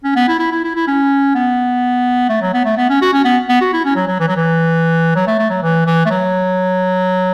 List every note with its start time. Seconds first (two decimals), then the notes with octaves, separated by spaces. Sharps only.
0.04 C#4
0.16 B3
0.28 E4
0.39 E4
0.52 E4
0.64 E4
0.76 E4
0.88 C#4
1.35 B3
2.29 A3
2.42 F#3
2.54 B3
2.65 A3
2.77 B3
2.90 C#4
3.02 F#4
3.13 C#4
3.25 B3
3.49 B3
3.61 F#4
3.73 E4
3.85 C#4
3.96 F#3
4.08 F#3
4.20 E3
4.28 F#3
4.36 E3
5.15 F#3
5.27 A3
5.39 A3
5.50 F#3
5.62 E3
5.86 E3
6.06 A3
6.11 F#3